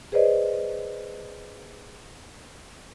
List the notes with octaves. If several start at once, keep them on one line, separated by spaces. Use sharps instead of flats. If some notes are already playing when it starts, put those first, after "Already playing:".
G#4 B4 C5 D5 D#5